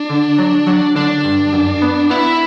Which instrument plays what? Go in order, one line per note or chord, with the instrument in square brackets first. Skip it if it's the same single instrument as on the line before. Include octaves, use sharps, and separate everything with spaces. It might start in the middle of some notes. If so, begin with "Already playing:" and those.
Already playing: [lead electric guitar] D4
[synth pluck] D3
F#3
F#3
[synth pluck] D3 [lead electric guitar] D4
[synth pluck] G2
F#2
B3
[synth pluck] B3 [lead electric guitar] E4